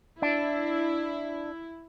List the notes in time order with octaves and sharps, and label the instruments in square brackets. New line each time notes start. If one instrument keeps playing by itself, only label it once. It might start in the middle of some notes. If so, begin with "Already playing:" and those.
[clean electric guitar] D4 [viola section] E4